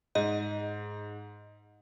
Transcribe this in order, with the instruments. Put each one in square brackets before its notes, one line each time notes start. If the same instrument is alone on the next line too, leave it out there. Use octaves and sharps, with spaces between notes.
[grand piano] G#2 [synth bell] D#5